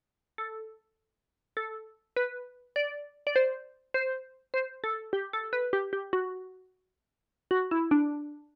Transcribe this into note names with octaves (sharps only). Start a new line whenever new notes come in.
A4
A4
B4
D5
D5
C5
C5
C5
A4
G4
A4
B4
G4
G4
F#4
F#4
E4
D4